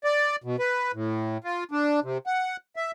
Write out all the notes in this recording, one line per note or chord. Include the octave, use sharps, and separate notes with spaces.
D5
B2
B4
A2
F4
D4
C3
F#5
E5